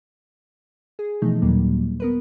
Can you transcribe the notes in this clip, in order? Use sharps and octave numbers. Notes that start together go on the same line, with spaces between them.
G#4
B2 E3 F3 A3 D#4
D#2 A#2 D#3 F#3 G3 A#3
B3 A#4 B4